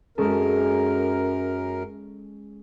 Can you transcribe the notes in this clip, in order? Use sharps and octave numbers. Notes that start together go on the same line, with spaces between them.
F#2 G#3 C#4 A4 A#4